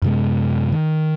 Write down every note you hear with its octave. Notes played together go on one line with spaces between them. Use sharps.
F#2 C3 G#3
D#3